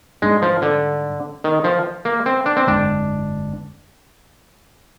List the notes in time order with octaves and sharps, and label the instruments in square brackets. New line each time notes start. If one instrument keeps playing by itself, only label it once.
[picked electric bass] G#2 G3 D4 [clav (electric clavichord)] G#3
[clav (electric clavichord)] F3
D3
D#3
F3
A#3
C4
D4
C4
[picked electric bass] G1 F2 D3 G#3 [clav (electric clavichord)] D4